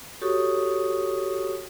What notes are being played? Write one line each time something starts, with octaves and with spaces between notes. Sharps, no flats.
F#4 G4 A4 C#5 C#6 D#6